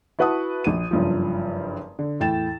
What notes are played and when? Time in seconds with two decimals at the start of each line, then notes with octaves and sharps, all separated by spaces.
0.19 E4 F#4 B4 F#5 A5 D#6
0.64 A#1 D#7
0.91 F#1 G2 F3
1.99 D3
2.20 E2 A2 G5 A6 E7